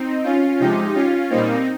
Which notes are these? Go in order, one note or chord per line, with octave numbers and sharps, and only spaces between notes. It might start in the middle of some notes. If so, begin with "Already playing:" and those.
Already playing: C4 D#4
C#4 F4
C3 F3 G#3 D#4 G4
C#4 F4
A#2 G3 A#3 C4 D#4